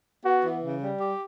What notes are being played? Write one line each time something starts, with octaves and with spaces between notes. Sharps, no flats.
B3 F#4
E3
C#3
G3
G4